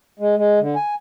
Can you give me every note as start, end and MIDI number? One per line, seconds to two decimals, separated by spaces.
0.20 0.36 56
0.37 0.59 56
0.60 0.75 50
0.76 0.95 80